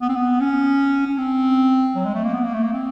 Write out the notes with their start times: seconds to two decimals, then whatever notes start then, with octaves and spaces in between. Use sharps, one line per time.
0.02 B3
0.09 C4
0.16 B3
0.41 C#4
1.07 C#4
1.18 C4
1.96 F#3
2.05 G#3
2.15 A3
2.24 A#3
2.34 B3
2.44 A#3
2.54 A3
2.63 A#3
2.73 C4